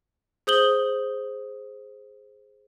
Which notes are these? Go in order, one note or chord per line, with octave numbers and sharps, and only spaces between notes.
G#4 C5 D#6 G6 F#7 G7